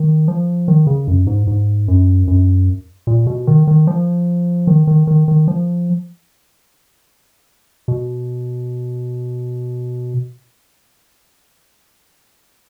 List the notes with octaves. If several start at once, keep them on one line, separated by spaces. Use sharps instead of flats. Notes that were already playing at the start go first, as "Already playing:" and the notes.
Already playing: D#3
F3
D#3
C#3
F#2
G#2
G#2
F#2
F#2
A#2
B2
D#3
D#3
F3
D#3
D#3
D#3
D#3
F3
B2